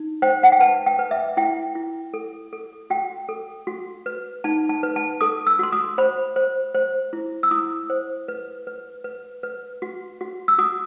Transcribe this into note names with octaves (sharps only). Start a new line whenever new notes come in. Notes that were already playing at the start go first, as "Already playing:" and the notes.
Already playing: D#4
C5 G5
F#5
G5
B4 A5
G5
B4
E5
E4 G5
E4
A4
A4
F#4 G5
A4
F#4
B4
D#4 A5
A5
B4
A5
A4 D#6
E6
F#4 C6
D#6
C5 B5
C5
C5
E4
E6
E4 D#6
C5
B4
B4
B4
B4
F#4
F#4
E6
F#4 D#6